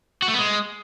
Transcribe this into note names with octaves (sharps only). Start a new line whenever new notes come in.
F#4
A3
B3
G#3